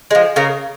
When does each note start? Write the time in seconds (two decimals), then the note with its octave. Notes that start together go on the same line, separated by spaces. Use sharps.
0.11 F3 G#3
0.36 C#3 A#4